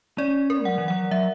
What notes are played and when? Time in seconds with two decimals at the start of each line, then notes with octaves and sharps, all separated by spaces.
0.18 C#4 D5
0.50 A#4
0.65 F#3 F#5
0.78 E3
0.88 F#3 F#5
1.11 F#3 E5